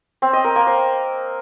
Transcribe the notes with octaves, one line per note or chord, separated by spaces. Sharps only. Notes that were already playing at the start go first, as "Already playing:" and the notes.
C4
D#5
A#4
A#3
C5